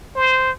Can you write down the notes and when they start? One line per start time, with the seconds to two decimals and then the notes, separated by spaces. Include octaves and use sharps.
0.15 C5